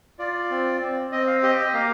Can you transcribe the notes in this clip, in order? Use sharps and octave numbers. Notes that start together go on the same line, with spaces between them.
F4 D5
C4
C4
C4 D#5
F5
G4 D#5
D#5
A#3 F5